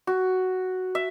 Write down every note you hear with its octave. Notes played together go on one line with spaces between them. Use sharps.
F#4
E5